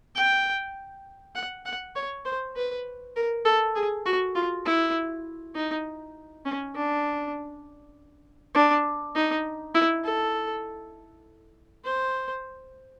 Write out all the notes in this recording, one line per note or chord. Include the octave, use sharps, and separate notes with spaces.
G5
F#5
F#5
C#5
C5
B4
A#4
A4
G#4
F#4
F4
E4
D#4
C#4
D4
D4
D#4
E4
A4
C5